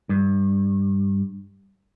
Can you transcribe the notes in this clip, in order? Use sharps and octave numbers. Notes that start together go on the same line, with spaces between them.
G2